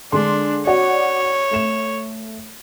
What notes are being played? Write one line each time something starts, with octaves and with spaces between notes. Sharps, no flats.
D3 G#3 D4 C6
F#4 C#5 D5 F#5
A3 E7